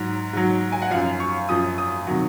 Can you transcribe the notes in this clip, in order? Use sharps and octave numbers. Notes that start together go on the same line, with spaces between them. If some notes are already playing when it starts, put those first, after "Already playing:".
Already playing: G#2 F#3
G#2 F#3
G#5
F#5
F#2 F3 F5
C#6
F#2 F3 D#6
D#6
C3 D#3 F#3